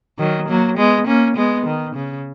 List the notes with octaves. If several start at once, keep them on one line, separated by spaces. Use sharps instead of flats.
D#3 F#3
F#3 A#3
G#3 B3
A#3 C#4
G#3 B3
D#3
C#3